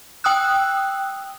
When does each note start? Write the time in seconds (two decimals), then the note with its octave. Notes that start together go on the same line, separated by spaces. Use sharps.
0.24 G5 D#6 E6 F#6